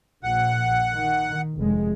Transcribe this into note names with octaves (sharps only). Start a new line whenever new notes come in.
A#1 F#5
D#3
F1 G#3